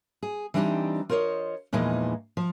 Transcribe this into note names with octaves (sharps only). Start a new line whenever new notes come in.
G#4
E3 G3 C4 D4 D#4 G4
F4 A#4 C5 C#5 D#5
E2 A#2 E3 F3 G#3 D#4
F3